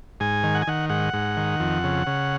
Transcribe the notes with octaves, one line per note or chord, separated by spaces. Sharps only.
G#2 G#5
D#3
F#5
G#5
D#3 F#5
G#2 F#5
G#2
D#3
F2
C#3
C#3